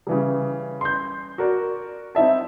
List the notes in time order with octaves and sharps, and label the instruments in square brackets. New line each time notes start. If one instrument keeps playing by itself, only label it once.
[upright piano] C#3 E3 G3
C6 G6
F#4 A#4 D5
C4 D#4 E4 E5 A5